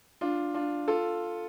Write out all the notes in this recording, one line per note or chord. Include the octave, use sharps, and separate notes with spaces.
D4 F4
D4 F4
F4 A4